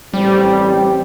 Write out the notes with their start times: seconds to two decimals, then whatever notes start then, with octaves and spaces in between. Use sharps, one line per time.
0.14 A1 G3 C4 G4